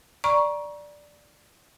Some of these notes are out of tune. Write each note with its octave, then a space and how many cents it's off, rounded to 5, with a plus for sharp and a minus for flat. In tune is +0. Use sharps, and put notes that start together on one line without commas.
D5 +0 A#5 +25 C#6 +0